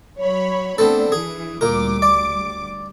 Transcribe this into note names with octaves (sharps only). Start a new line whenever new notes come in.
F#3 C#5 B5
A3 B3 C4 D4 A4
E3 G#4
D2 A#2 G3 A#4 D6
D5